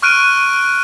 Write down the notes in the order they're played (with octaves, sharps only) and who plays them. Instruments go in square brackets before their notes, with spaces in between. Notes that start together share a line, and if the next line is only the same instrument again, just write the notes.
[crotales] C#6 F6 F#6 D7 D#7